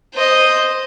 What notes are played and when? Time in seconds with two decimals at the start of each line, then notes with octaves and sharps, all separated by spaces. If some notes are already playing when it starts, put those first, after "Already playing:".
0.15 C5 D#5